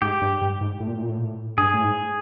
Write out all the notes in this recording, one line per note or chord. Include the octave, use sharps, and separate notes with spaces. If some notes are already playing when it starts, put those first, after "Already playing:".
G#2 G4
G2
G2
G#2
A2
A#2
A2
A#2
A2
A#2
A2
G2 G#4
A2
G#2